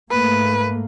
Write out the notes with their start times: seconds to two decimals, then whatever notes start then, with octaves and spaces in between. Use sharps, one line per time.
0.11 G#2 A3 A#3 B4